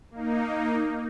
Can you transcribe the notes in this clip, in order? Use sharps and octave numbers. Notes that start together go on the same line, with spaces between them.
A#3 D#4